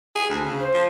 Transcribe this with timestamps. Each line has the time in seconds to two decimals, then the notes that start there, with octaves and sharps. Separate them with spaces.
0.15 G#4
0.30 D2
0.45 C#3
0.60 C5
0.74 F3